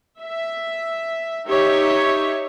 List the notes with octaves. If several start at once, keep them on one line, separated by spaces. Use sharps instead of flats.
E5
D#4 G4 C#5 E5